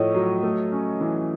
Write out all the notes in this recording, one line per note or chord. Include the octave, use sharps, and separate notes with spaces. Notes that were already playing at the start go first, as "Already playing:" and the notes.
Already playing: A2 F3 A3 C#5 D#5
F#3
A3
C#4
E3